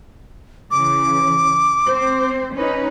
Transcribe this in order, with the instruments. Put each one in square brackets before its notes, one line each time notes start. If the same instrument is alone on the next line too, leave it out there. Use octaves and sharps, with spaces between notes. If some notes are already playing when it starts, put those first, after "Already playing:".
[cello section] C#3 E3 [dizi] D6
[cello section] C4 C5
C#4 D#4 B4